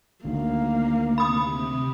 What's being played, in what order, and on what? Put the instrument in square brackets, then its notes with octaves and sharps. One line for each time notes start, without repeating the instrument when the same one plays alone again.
[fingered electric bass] D2 D#3 [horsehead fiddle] A#3
[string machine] C3 [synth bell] B5 D#6